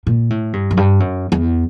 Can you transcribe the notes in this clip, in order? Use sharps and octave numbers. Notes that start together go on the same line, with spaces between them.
A#2
A2
G2
F#2
G2
F#2
E2